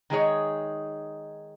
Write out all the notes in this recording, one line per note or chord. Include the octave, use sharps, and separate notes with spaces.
D#3 G#3 D#4 G#4 C#5